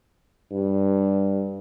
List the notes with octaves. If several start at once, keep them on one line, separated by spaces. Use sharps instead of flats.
G2